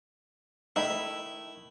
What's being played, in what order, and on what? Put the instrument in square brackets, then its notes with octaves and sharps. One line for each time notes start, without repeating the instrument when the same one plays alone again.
[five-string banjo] D#3 A3 B5 [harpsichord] E4